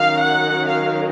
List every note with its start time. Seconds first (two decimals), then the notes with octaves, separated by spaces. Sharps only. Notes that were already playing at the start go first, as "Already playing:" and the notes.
Already playing: D#3 F#3 C#4 F5
0.24 F#5
0.68 F5